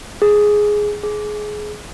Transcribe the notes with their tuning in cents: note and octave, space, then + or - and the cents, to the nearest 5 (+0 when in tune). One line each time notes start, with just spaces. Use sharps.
G#4 +5
G#4 +20